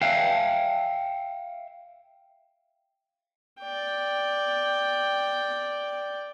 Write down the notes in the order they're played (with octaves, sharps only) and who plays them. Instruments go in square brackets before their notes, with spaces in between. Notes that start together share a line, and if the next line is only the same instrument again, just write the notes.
[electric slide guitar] E5 F5 G5
[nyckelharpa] D5 G5